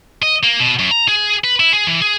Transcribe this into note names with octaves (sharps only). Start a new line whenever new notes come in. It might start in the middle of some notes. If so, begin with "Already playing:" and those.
D#5
A#3
B2
F#2
A#5
G#4
B4
E4
G#4
E3
G#4